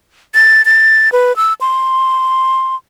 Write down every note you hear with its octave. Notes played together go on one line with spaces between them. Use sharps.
A6
A6
B4
E6
C6